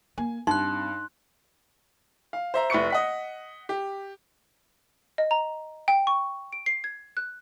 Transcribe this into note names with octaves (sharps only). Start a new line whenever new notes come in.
A#3 G#5
G2 C4 D#4 C6 F#6
F5
C5 E5 A#5
F1 E4 B4 C#6 C#7
D#5 F#5 B6
G4
D#5
A#5
G5
C#6
D7
C7
G#6
F#6